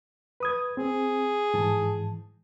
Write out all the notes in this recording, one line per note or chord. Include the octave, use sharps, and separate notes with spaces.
B4 D#6 G#6
C4 G#4
G#2 E3 A5